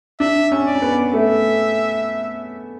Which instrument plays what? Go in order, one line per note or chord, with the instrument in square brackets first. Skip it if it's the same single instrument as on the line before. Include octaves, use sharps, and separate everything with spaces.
[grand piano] D4 [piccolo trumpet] E5
[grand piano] C#4
[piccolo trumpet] D5
[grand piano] C#4
B3
[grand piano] A3 [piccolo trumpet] E5